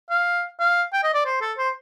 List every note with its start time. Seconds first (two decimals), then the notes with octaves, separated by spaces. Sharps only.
0.10 F5
0.59 F5
0.93 G5
1.03 D#5
1.14 D5
1.25 C5
1.41 A4
1.57 C5